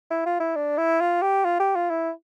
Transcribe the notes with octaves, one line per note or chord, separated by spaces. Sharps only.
E4
F4
E4
D4
E4
F4
G4
F4
G4
F4
E4